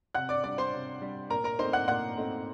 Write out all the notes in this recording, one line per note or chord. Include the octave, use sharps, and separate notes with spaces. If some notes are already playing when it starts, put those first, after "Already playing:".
C3 F#5 F#6
D5 D6
G3 D4 D5 D6
C5 C6
C3
G3 D4
A#2 A#4 A#5
A#4 A#5
A3 C4 D#4 C5 C6
F#5 F#6
A#2 F#5 F#6
A3 C4 D#4